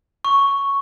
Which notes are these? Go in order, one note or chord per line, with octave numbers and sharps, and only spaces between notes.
C#6